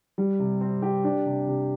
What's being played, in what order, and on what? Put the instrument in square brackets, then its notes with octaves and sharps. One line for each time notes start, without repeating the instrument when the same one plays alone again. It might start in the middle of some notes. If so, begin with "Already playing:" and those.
[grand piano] G3
C3
C4
G4
D4
C3
C3